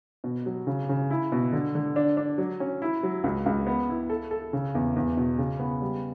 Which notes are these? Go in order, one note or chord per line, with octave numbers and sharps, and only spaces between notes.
B2
F#3
C#3
C#3
E4
B2
D3
D3
D4
D4
F#3
C#4
E4
F#3
C#2
C#2
B3
E4
A4
A4
C#3
E2
E2
B2
C#3
B3
G3